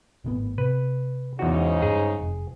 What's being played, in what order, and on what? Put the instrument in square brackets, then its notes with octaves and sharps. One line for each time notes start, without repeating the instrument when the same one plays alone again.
[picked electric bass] G#1 A2 B3
[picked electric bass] C3 [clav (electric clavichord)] B4
[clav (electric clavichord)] E2 F#4 [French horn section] G#2 C#3 D#4
[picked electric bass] G2 [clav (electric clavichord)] G#4
[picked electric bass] F1